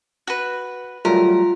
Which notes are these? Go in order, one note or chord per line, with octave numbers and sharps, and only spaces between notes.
F#4 B4 F#6
F#3 G3 A3 F4 A#4